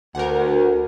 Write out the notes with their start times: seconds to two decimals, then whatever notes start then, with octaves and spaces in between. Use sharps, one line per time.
0.15 D2 A#4 F#5